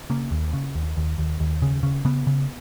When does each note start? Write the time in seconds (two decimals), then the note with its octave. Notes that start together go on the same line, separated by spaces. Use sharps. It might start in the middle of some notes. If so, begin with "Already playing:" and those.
0.10 C#3 A#3
0.31 D#2
0.53 C#3
0.75 D#2
0.97 D#2
1.18 D#2
1.40 D#2
1.62 C#3
1.83 C#3
2.05 C#3 B3
2.27 C#3